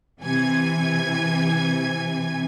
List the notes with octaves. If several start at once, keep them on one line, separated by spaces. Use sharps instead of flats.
C3 E3 G#5 G#6